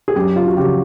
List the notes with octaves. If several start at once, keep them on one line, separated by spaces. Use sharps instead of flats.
G#4
F#2 G4
F4
F#4
C#3 F3 G4